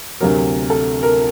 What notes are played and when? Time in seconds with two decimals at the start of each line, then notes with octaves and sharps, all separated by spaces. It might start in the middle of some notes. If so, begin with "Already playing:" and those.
0.21 D2 C3 F#3 A#4
0.70 A4
1.03 A#4